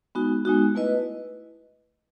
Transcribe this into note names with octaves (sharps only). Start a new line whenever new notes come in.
G#3 B3 D#4 F#4
G#3 B3 D#4 F#4
A3 E4 B4 D#5